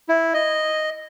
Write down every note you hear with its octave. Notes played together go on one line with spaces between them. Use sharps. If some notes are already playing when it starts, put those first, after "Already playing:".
E4
D#5